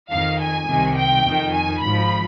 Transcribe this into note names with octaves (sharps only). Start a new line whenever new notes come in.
F2 D#3 F5
G#5
C2 C3 D#3
G5
F2 D#3
G#5
G#1 G#2 F3 B5